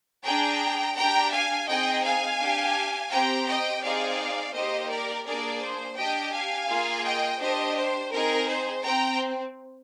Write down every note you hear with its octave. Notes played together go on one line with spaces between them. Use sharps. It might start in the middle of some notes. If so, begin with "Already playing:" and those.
D4 G#4 G5 A#5
D4 G4 G5 A#5
F5 G#5
C4 D#4 G#4 D#5 G5
F5 G#5
D4 G4
C4 G4 G5 A#5
D#5 G5
C4 D#4 G#4 D5 F5
A#3 D#4 G4 C5 D#5
A#4 D5
A#3 D4 G#4 A#4 D5
C5
D4 G4 D#5 G5
F5 G#5
A#3 F4 G#4
D#5 G5
D4 G4 C5 D#5
C5
C4 D#4 G#4 A#4
C5
C4 G5 A#5